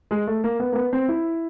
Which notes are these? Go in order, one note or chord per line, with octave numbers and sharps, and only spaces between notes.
G#3
A3
A#3
B3
A#3
B3
C4
E4